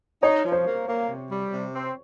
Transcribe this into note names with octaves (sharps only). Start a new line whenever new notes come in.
D#4 C#5
F3
C5
A#3
A#3
C3
G3
C3
C4